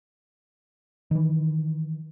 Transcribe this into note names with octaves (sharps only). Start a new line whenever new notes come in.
D#3 E3